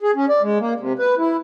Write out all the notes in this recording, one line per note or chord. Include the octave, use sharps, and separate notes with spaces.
G#4
C#4
D5
G#3
A#3
C3
B4
E4